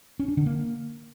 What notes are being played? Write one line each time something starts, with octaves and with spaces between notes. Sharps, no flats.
C#4
D4
D3
A#3